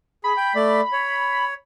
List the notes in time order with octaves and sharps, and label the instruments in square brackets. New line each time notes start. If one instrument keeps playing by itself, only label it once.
[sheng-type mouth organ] G#4 [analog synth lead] B5
[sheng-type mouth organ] G5
A3 D5
C#5